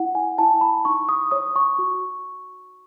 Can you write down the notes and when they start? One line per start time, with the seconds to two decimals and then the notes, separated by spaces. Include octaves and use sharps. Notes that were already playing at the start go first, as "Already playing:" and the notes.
Already playing: E4 F#5
0.15 G#5
0.38 E4 A5
0.61 B5
0.85 D#4 C#6
1.09 D#6
1.31 C#5 D#6
1.56 C#6
1.78 F#4